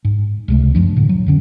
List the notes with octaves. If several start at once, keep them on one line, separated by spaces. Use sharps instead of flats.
G#2
C#2 C3 A3
F#2 F3 D4
A2 D3
F#3
F2 D3 C#4